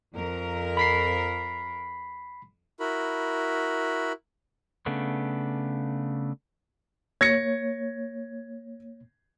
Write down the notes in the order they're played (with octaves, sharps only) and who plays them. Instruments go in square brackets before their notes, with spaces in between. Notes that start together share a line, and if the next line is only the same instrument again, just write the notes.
[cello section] F2 A#4
[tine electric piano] B5 B6 C7
[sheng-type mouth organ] E4 F#4 A#4 B5
[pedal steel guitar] C#3 A3 B3 D4
[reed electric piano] A#3 C#5 [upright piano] G#6 A#6 C#7